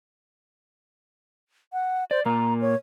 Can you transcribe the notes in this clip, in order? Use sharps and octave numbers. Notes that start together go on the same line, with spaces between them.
F#5
C5 D5
A#2 A#3 A#5
C#5